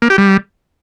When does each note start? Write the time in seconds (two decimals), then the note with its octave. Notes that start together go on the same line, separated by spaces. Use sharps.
0.02 A#3
0.10 G4
0.18 G3